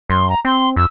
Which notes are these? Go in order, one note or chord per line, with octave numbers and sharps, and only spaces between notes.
F#2 C6
A#5
C4 C6
F2 E6